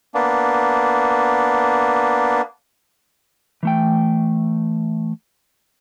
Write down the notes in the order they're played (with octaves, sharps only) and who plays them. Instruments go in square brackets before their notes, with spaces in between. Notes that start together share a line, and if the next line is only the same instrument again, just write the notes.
[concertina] A#3 B3 D4
[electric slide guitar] E3 A3 G5